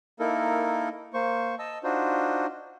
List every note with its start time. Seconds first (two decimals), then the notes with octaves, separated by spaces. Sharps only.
0.19 A#3 D#4 E4 A4 A#4
1.14 A#3 C5 C#6
1.59 D#5 A5 E6
1.84 D4 D#4 F4 F#4 C5